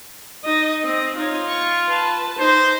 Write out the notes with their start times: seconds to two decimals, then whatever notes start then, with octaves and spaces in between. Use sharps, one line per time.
0.44 D#4 D#5
0.83 C4 D#5
1.16 D#4 F4 C#5
1.47 C#6
1.89 B4 A5
2.39 D#4 C5